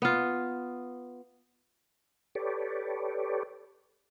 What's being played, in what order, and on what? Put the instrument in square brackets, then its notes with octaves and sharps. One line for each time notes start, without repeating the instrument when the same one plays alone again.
[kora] B3 F4
[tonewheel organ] G4 A4 B4 C#5 D5